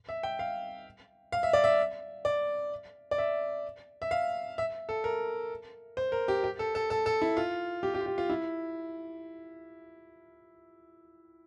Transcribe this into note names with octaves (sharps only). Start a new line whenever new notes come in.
E5
G5
F5
F5
E5
D5
E5
D5
D5
E5
E5
F5
E5
A4
A#4
C5
A#4
G4
G4
A4
A4
A4
A4
E4
F4
G4
G4
F4
G4
F4
E4